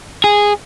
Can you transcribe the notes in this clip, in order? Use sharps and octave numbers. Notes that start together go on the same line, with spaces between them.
G#4